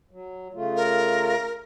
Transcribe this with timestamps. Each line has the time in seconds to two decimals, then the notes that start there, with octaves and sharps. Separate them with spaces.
0.11 F#3
0.54 C#3 A3 F4
0.76 A#4